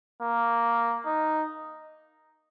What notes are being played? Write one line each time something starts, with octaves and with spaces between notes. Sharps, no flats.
A#3
D#4